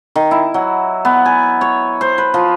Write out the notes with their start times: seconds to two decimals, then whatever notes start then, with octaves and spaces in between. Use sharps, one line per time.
0.16 D#3
0.31 E4
0.54 F#3
1.05 B3
1.25 G#5
1.61 C#5
2.01 C5
2.18 B4
2.34 F3